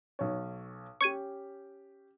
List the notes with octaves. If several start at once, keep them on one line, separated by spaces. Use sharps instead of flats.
B1 C#5
C#4 G4 C#6 G#6 D#7